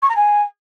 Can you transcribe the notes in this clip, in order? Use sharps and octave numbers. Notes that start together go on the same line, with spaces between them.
C#6
A#5
G#5